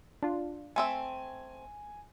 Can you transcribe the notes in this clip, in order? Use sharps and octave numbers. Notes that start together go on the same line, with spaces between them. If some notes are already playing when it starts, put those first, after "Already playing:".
D4 F4
A3 C4 E5 G#5